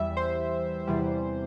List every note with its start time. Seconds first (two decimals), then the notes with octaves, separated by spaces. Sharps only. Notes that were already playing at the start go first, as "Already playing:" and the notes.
Already playing: E2 E3 G3 E5
0.17 C5
0.87 E2 C3 E3 G3